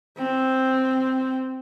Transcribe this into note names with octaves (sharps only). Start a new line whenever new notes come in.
C4